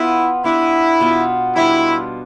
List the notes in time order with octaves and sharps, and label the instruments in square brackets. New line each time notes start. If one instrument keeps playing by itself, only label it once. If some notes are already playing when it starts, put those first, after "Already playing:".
Already playing: [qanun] B3 F4 B4 [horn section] E4
[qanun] B3 D4 G4 B4 [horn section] E4
[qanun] B2 B3 F4
[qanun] G3 D4 F4 [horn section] E4